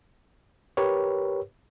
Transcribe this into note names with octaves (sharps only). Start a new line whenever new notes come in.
G4 A#4 B4 C#5